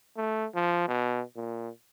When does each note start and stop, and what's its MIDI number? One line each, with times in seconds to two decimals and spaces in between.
0.17 0.46 57
0.55 0.84 53
0.88 1.22 47
1.36 1.69 46